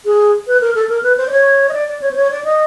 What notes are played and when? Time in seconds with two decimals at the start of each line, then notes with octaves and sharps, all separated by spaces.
0.05 G#4
0.47 B4
0.61 A#4
0.75 A4
0.89 A#4
1.03 B4
1.17 C5
1.27 D5
1.31 C#5
1.69 D#5
1.73 D5
1.88 D5
2.02 C#5
2.11 C5
2.16 C#5
2.31 D5
2.44 D#5